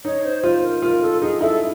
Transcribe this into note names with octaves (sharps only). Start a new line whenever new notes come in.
D#4 C#5
C5
F4 C5
A#4
F4 A#4
A4
D#4 G#4
E4 A4